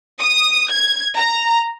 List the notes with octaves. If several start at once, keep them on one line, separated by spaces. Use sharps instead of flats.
D#6
G#6
A#5